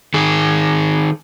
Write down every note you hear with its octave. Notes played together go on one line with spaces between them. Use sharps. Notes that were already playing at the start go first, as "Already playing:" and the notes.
D#3 G#4